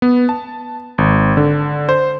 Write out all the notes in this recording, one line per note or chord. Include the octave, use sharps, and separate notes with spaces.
B3
A5
G#1
D3
C5